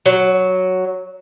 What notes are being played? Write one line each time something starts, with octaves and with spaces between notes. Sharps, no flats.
F#3